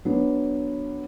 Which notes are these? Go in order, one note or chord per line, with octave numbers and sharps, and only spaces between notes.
F#3 B3 D4